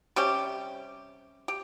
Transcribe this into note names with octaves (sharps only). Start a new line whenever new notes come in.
C3 G3 C#4 G4
G4